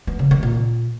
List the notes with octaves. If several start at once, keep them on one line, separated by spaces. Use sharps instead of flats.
B3
C#3
D#3
A#2